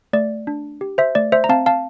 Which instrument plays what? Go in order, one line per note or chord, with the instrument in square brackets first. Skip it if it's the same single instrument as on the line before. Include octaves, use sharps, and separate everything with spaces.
[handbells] A3 D5
D4
G4
C5 E5
A3 D5
C5 E5
A#5
C4 F5 A5
F5 A5